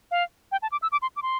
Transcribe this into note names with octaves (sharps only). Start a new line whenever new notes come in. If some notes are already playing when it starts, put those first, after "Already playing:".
F5
G5
A5
D6
E6
D6
C6
D6
C6